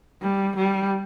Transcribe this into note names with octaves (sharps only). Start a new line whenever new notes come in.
G3
G3